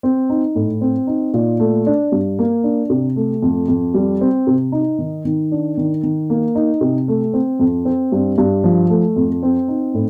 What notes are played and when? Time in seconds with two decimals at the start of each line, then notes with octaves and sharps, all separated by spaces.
0.03 C4
0.30 D#4
0.55 A2
0.81 C4
1.07 D#4
1.34 A#2
1.60 A3
1.86 D4
2.12 G2
2.39 A#3
2.64 D4
2.90 C3
3.16 A3
3.43 F2
3.68 F2
3.94 G3
4.21 C4
4.47 C3
4.72 D#4
4.99 D#3
5.25 D#3
5.52 D4
5.77 D#3
6.03 D#3
6.30 A#3
6.55 D#4
6.81 C3
7.08 A3
7.33 C4
7.60 F2
7.85 C4
8.12 G2
8.38 G2
8.64 F3
8.90 A3
9.16 F2
9.43 C4
9.68 D#4
9.94 A2